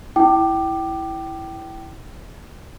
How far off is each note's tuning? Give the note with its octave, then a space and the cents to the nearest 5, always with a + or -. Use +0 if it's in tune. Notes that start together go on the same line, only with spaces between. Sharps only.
E4 +0 G5 -20 D6 +20